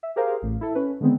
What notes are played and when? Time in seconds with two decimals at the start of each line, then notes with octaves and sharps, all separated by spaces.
0.03 E5
0.16 G4 G#4 A#4 C5 F5
0.42 A1 A2
0.61 E4 A4
0.75 C#4 B4
1.01 D3 D#3 G#3 B3 C4